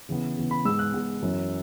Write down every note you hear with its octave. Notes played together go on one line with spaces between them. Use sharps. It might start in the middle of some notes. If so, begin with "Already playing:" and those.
C#3 E3 B3
C#3 E3 B3
B5
G#2 G#3 B3 E6
F#6
G#2 G#3 B3
F#2 E3 C#4